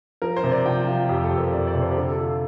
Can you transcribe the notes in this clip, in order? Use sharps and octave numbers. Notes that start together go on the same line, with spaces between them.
F3 A#4
C5
C3
D5
F3 G5
F3 F5
F2 G4
A4
F2
A#4
C3 D5
D5
C3
C5
G4
D3 A4
A4
F4